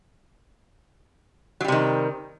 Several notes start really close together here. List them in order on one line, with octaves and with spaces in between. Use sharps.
F#3 G3 C3 D#3